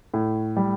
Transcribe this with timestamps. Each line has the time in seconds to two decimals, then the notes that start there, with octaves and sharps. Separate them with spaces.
0.14 A2
0.57 G3